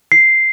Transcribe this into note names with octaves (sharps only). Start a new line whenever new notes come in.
C7